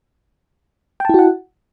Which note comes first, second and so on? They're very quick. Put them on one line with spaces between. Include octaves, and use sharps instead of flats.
G5 A5 E4 F#4 F#5